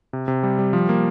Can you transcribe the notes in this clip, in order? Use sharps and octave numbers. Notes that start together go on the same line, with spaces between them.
C3
C3
G3
G3
F3
A#3